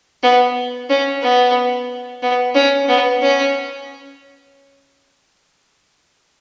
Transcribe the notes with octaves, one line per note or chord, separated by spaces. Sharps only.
B3
C#4
B3
B3
C#4
B3
C#4